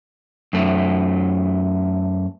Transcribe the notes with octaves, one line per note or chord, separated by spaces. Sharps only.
F#2 A3